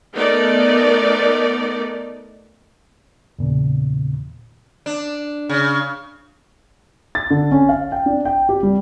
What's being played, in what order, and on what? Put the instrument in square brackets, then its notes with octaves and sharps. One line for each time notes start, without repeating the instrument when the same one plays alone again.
[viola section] A3 B3 D#4 A#4 D5
[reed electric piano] E2 A#2 C#3
[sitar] D4
C#3
[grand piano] A6
D3
C#4
F5
G5
D4
G5
G4
G3